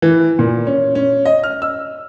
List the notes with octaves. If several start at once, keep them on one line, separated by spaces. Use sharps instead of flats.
E3
A#2
C#4
C#4
D#5
F6
E6